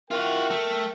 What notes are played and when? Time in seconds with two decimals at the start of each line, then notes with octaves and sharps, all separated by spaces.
0.11 F4 F#4 A#4 E5 G5
0.50 A3